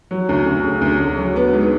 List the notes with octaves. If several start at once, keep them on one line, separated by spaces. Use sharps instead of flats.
F#3
D2
D2
C#3
D2
D2
F#3
B3
G#2